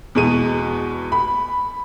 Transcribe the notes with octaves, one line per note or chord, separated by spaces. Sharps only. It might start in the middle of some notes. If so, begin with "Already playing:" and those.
E2 B2 G#3 D#7
B5